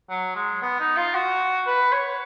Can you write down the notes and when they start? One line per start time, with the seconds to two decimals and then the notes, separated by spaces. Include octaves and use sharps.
0.10 F#3
0.36 G#3
0.62 B3
0.80 D#4
0.97 F4
1.15 F#4
1.67 B4
1.93 C#5